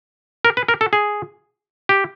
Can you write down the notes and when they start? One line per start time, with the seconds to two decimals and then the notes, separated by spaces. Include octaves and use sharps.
0.45 A#4
0.57 B4
0.68 A#4
0.81 A4
0.93 G#4
1.89 G4